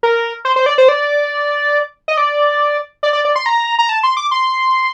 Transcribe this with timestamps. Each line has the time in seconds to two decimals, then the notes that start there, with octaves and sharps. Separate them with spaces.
0.03 A#4
0.45 C5
0.56 C5
0.66 D5
0.78 C5
0.89 D5
2.08 D#5
2.17 D5
3.03 D5
3.13 D5
3.25 D5
3.36 C6
3.46 A#5
3.79 A#5
3.89 A5
4.03 C6
4.17 D6
4.31 C6